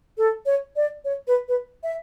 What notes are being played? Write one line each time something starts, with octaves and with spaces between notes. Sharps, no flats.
A4
C#5
D5
C#5
B4
B4
E5